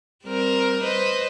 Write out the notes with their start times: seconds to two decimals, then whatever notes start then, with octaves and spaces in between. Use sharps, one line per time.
0.25 G3 C4 A#4
0.83 B4 C5 D#5